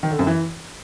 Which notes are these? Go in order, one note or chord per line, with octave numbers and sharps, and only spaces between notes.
D#3
D3
F#2
E3